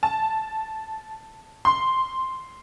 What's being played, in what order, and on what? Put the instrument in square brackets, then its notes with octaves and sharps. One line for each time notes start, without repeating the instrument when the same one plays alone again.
[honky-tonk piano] A5
C6